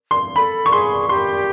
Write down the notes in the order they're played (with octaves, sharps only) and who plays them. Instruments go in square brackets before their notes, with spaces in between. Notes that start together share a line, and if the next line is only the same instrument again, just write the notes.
[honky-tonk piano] C6
[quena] A4 [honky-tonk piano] B5
[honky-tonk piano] C#6
[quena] G#4 [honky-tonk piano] C6
[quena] G4 [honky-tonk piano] C6